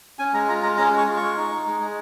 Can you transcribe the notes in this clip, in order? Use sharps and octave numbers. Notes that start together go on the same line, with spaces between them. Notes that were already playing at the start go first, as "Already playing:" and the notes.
C#4 G#5
G#3 A#5
F4 A#5
G#3 A#5
C#4 A#5
G#3 C#6
F4
C#6
G#3
D#4
D#4
G#3
G#3